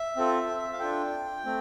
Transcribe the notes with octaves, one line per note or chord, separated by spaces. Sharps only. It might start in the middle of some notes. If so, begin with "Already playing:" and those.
Already playing: E5
C4 F4 A4
F5
D4 F4 A4 G5
A3 C4